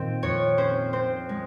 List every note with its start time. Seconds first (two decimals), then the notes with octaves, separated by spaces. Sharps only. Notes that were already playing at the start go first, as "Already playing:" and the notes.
Already playing: A#2 D#3 C4
0.23 F2 C#5
0.58 C#4 C5
0.93 C4 C5
1.29 G#3